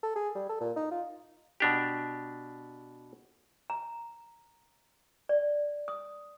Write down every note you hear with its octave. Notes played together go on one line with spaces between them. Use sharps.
A4
G#4
G3
A4
A#2
D#4
F4
B2 D4 G4
A#5
D5
D#6